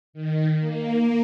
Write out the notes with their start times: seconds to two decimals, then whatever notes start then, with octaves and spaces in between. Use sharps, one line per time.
0.13 D#3
0.59 A#3